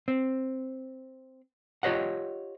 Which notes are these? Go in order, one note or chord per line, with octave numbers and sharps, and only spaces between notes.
C4
F4 G4 C#5 D#5 F#5